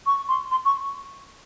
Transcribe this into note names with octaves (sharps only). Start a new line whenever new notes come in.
C#6
C6
C6
C#6